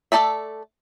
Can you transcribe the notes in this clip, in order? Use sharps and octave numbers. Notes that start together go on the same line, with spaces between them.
A3 E4 A4 D5 E5